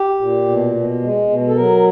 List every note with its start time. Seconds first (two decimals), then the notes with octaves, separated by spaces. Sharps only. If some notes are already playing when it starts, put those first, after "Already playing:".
Already playing: G4
0.21 A#2
0.48 B2
0.76 B2
1.03 G#3
1.29 B2
1.48 A4
1.56 F#3 A#4